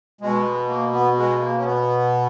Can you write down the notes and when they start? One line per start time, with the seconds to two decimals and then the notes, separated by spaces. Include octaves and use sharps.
0.21 B2 G#3
0.69 A#3
0.93 B3
1.16 G#3
1.40 A#3
1.56 C#4
1.64 B3